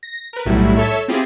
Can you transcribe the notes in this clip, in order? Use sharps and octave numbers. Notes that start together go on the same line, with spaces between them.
A#6
A#4 B4
B1 A2 F#3 G3 E4
A4 C#5 E5
C4 E4 F4 G4 G#4